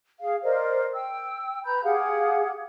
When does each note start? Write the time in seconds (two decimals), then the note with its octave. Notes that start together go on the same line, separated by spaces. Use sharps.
0.20 G#4 F5
0.44 A#4 C5 D5 D#5
0.93 G5 E6
1.65 B4 A#5 B5 G6
1.84 G4 G#4 F5 F#5